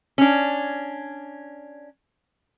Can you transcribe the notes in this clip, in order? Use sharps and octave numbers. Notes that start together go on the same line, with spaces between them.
C#4 D4